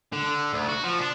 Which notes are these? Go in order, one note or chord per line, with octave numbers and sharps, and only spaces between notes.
D3
D2
F#4
F3
D4